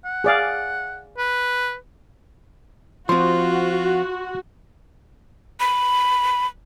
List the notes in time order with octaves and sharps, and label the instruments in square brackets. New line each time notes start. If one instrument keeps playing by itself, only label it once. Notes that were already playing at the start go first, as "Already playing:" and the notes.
[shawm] F#5
[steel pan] G#4 D5 F5
[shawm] B4
[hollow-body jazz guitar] F3 C4 [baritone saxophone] F4 [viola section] F#4 [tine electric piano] C6
[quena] B5